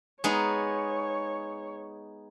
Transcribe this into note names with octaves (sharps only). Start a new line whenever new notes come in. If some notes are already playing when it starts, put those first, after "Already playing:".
G#3 B3 D#4 C#5